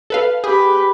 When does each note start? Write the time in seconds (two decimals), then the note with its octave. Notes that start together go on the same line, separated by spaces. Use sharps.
0.10 A4 B4 F5
0.44 G4 G#4 B4